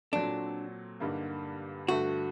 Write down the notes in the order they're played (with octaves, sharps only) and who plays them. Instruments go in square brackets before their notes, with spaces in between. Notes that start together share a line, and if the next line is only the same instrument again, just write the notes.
[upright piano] A#2 F#3 C4 F#4 A4 [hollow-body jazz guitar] D4
[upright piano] G2 D3 G3 A#3 D#4
[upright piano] G2 D3 A3 [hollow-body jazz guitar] F#4